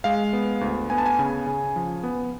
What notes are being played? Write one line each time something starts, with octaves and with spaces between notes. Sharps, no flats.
G#3 F5
B3
D2
B3 G#5
A5
G#5
C#3
C#3
F3
B3